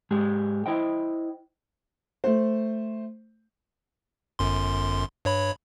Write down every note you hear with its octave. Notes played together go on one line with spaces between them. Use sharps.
G#2 G#3 G4 G#4
E4 C5 D#5 G5
A3 C5
G1 F#2 C6
G2 C#5 B5